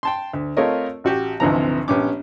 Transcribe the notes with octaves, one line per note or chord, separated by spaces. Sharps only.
G5 A5 C6
D2
A3 C4 F4 A#4 C#5 D#5
A1 F#4 G4
G#1 D2 C3 E3 F3 A#5
A#1 B3 C#4 G4 D6